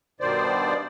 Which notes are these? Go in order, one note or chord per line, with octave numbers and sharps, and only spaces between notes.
G2 B2 D#3 C5 D5